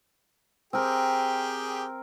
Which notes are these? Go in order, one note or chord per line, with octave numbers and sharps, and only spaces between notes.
C4 G4 G#4 A#4 G5